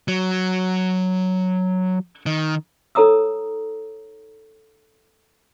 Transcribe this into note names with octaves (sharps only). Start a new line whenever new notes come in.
F#3
D#3
D#4 A4 C#5 A#5 D#6 E6